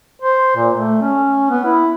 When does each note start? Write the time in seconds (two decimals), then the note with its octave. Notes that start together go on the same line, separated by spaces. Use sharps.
0.22 C5
0.56 A#2
0.74 A3
1.02 C#4
1.50 B3
1.65 E4